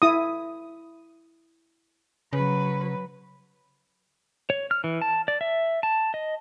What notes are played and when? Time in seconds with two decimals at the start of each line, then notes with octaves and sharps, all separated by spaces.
0.02 E4 D#6
2.33 C#3 F#3 B4
4.50 C#5
4.71 F6
4.84 E3
5.02 A5
5.28 D5
5.41 E5
5.83 A5
6.14 D#5